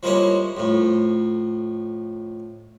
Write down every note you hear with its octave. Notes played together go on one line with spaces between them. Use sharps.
F3 G3 G#3 A#3 C#4 E4
F2 A2